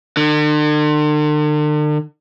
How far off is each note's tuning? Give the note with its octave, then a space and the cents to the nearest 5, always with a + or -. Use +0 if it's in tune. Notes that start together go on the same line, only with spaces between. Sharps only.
D3 +45